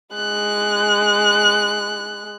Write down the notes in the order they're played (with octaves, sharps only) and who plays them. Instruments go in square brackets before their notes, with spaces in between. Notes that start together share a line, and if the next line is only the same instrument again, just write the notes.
[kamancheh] G#3 F#6